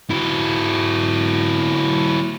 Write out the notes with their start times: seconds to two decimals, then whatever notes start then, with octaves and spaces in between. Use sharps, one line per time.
0.10 F#3 E4